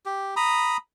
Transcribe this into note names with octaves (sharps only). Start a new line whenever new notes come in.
G4
A#5 B5 D#6